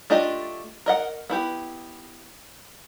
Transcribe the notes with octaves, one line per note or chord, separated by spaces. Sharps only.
A3 D4 F4 G4 D#5
A#4 D#5 F#5
B3 E4 G4